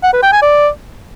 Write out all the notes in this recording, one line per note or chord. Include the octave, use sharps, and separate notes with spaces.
F#5
B4
G5
G#5
D5